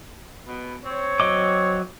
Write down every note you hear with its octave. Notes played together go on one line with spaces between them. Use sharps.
B2 B3
C4 C#5
F#3 D#5 D6